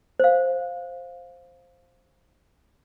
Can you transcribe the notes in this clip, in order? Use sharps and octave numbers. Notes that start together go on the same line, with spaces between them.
C5 F5